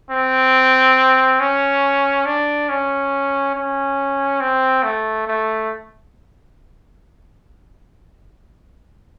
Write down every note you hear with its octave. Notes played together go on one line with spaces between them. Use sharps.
C4
C#4
D4
C#4
C#4
C4
A3
A3